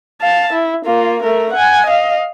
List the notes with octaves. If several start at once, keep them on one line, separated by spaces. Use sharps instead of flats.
F5 A5
E4
A#3 F4
A3 A#4
F#5 G#5
D#5 F5